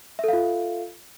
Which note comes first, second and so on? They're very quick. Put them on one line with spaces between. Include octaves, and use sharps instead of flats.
E5 A4 F5 F4